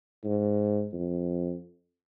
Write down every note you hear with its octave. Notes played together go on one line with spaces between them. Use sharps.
G#2
F2